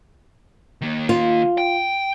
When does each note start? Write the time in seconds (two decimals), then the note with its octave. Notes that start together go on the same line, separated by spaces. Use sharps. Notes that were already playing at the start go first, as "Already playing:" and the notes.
0.81 D#3 A#3
1.09 F4
1.58 G5